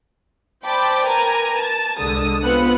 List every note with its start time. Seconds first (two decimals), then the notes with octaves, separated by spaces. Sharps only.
0.65 C5 D5 G5 A5 B5 D6
1.04 A#4 B4 G#5 A#5
1.57 A5
1.99 C2 D3 G#3 D#6
2.42 B3 C4 F4 B4 F#6 C#7